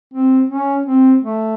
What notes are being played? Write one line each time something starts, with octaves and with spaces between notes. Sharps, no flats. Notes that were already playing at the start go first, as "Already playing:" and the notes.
C4
C#4
C4
A3